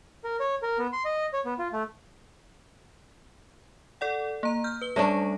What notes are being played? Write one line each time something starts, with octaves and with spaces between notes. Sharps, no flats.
A#4
C#5
A#4
B3
C6
D#5
C#5
B3
F4
A3
A4 D5 F#5
A#3 A#5
F6 G6
B4 G7
G3 A3 C#4 D4 C#5 A#6